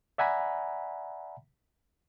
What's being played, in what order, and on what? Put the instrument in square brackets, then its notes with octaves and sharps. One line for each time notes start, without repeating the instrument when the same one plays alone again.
[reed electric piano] D5 E5 F#5 G#5 A#5 B5